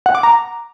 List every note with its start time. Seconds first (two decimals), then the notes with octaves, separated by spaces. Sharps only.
0.06 F#5
0.15 D6
0.23 A#5